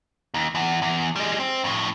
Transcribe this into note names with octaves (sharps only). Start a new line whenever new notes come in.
D#2
E2
E2
G3 G#3
C4
F2 A2